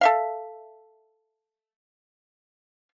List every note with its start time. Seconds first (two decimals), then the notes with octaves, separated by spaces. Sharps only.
0.01 A4 E5 F5